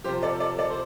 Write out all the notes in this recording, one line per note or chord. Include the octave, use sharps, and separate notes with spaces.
C3 F3 G4 C5
A4 D5
A4 D5
A4 D5
C5